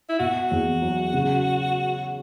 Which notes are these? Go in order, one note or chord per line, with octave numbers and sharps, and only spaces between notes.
E4
B2 F#4
E2
F#3
C#3